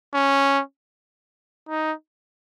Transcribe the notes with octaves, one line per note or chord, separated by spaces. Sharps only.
C#4
D#4